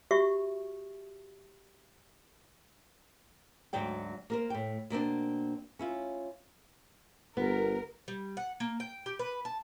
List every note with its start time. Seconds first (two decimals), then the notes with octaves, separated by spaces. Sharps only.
0.11 F#4 G4 E5 C#6
3.73 D2 G#2 F#3 D5 G5
4.30 A#3 A#4 C5
4.50 A2 G5
4.90 B2 A#3 C4 D4
5.79 C#4 E4 F4
7.37 G1 B3 A#4
8.08 G3
8.37 F#5
8.60 A#3
8.80 G5
9.06 G4
9.19 B4
9.45 A5